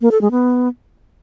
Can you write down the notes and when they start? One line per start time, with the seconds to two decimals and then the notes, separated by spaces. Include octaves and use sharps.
0.01 A#3
0.11 A4
0.21 G#3
0.31 B3